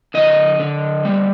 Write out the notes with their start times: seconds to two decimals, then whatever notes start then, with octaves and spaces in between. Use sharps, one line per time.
0.14 D3 D#5
0.60 D3
1.05 G3